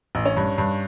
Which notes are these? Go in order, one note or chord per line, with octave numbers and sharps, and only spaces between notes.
A1
C#4
G2
G2